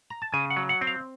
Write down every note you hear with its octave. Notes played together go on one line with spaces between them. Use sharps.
A#5
A5
C#3 G#5
F#5
F#3
F#5
C4
F5